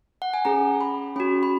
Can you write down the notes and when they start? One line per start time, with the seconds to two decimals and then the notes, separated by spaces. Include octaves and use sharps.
0.22 F#5
0.34 G#5
0.45 C#4 G#4 A#5
0.81 B5
1.16 C#4 F#4 B5
1.43 B5